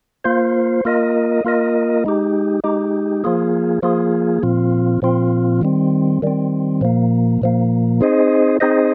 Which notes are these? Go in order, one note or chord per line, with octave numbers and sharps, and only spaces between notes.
A#3 F4 C5
A#3 F4 A#4 D#5
A#3 F4 A#4 D#5
G#3 D#4 G4
G#3 D#4 G4
F3 A#3 F4 G#4
F3 A#3 F4 G#4
A#2 F3 C4 F4
A#2 F3 C4 F4
D#3 G3 C4
D#3 G3 C4
A#2 F3 A#3
A#2 F3 A#3
C4 D#4 G#4 C5 D#5
C4 D#4 G#4 C5 D#5